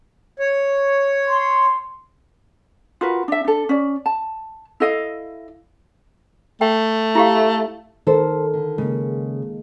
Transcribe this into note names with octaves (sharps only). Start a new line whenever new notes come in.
C#5
C6
F4 F#4 A#4 B4
D4 E5
D4 A4
C#4 D5
A5
E4 A4 D#5 F5
A3 G5
E4 G4 F5
D#3 A4 A#4 C5
D3
C#3 G#3 A#3